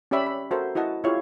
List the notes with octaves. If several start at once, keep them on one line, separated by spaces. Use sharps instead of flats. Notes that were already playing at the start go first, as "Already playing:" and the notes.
C#4 G4 C#5 D5 E5 B5
B5
F#4 A4 A#4 C5 E5
E4 F#4 D#5 F#5 A5
E4 F4 G4 G#4 C#5 F5